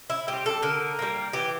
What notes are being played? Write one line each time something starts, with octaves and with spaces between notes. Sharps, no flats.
E4
G3 C4 G4
A4
D3 A#4
G3 A#3
E3 G4